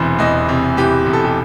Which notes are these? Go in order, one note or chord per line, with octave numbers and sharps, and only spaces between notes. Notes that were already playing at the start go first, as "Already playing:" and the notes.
Already playing: E1 E2 C3 E3 C5
E2 D#5
C3
E3 G4
E1
A4
G4